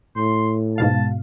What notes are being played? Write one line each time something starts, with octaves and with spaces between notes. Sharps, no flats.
A2 C6
G#2 B2 F5 A5